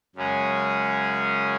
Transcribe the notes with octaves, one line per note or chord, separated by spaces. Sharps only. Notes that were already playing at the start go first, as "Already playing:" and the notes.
F#2 C#3 G#3 C#4 G#4